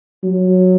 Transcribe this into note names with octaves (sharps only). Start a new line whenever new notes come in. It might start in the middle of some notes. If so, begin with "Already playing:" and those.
F#3